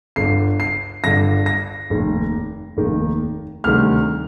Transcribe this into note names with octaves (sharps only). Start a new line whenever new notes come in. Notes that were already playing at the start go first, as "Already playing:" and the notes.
G1 G2 D3 C7
C7
G1 G2 D3 A#6
A#6
F1 D#2 D#3
F1 D#2 D#3
D2 C3 D#3 G3 F6